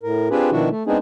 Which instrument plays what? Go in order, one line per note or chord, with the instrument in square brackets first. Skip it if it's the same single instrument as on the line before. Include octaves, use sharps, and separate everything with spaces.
[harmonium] A2 A#4
C4 D4 F4 G4 G#4 B4
B2 D#3 F3 D4 E4 F#4
A3
G#3 B3 C4 D4 D#4 G#4